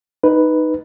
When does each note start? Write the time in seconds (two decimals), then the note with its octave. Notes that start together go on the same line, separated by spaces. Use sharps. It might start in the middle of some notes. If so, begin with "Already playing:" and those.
0.23 D#4 B4